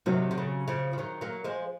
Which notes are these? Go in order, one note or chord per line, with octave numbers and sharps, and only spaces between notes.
C3 D#3 F#3
C3
C#3
C#3 F3
F3
D#3 F#3
F#3 A#3
F3 G#3